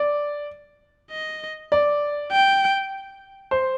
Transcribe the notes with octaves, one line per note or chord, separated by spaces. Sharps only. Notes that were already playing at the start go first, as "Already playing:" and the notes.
Already playing: D5
D#5
D5
G5
C5